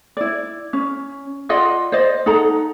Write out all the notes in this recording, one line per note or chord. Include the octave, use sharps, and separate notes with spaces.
E4 D5
C#4
F4 D5 D#5 F#5
C5 D5 D#5
D#4 A4 F#5 A#5